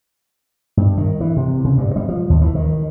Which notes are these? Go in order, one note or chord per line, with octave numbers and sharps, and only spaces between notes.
G2
D#3
E3
C3
C#3
G2
G3
F3
D#2
E3
D#3